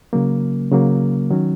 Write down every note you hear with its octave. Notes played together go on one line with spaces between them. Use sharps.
C#3 F#3 A#3
C#3 F#3 A#3
D#3 F#3 C#4